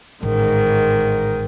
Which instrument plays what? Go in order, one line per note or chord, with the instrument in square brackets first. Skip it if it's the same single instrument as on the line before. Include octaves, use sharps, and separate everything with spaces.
[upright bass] A1 [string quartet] G#2 D#3